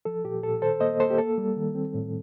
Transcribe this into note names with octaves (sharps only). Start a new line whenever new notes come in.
F3 A4
A#2 G4
A#2 A4
D#3 A4 C5
A#3 C5 D#5
A#3 A4 C5
G4
A#3 A4
G3
D#3
C4
A2